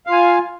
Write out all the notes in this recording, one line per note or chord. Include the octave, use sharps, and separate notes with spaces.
F4 F5 G#5